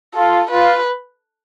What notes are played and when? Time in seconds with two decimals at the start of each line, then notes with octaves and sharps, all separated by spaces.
0.15 F4 A4
0.51 F4 B4